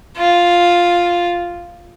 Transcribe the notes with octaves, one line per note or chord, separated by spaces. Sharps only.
F4